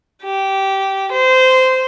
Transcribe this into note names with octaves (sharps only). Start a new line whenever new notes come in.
G4
C5